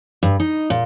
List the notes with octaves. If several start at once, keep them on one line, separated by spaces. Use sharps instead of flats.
G2
D#4
A#2